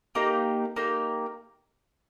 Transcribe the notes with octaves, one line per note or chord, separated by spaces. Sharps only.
A#3 D#4 G4
A#3 D#4 G4